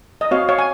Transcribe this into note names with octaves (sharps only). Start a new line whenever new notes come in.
D#5
C4 F#4 C#5 F5
C#5 F5
G#5